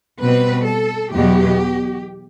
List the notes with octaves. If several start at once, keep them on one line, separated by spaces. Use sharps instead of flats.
B2 G3 C4 B4
A4
E2 B2 F#3 B3 G4